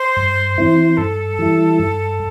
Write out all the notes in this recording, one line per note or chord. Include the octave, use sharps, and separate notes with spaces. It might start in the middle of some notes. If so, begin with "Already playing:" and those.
Already playing: C5
G2
E3 C4 E4
G2 A4
E3 G3 E4
G2